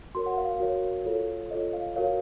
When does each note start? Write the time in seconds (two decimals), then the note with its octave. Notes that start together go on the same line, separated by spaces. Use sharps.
0.15 F#4 A#4 C#5 C6
0.26 F#5
0.37 F5
0.49 F5
0.60 F#4 A#4 C#5
1.05 F4 A4 C#5
1.51 F4 A4 C#5 D#5
1.73 F5
1.96 F#4 A#4 C#5 F5